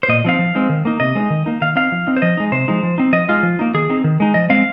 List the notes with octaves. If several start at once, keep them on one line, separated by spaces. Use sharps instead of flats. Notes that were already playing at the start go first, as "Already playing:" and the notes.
C5
A#2 D#5
F3 C4 D#4 F5
F3
G#3 C4 D#4
D#3
A#3 D#4
C3 D#5
G#3 C4 D#4
D#3
A#3 D#4
D#3 F5
C4 D#4 F5
F3
C4 D#4
C5
F3 D#5
G#3 D#4
C3 C5
F3 G#3 D#4
F3
C4 D#4
F3 D#5
G#3 D#4 F4
F3
A#3 D#4
D#3 G#4
C4 D#4
D#3
G#3 D#4
F3 D#5
G#3 C4 F5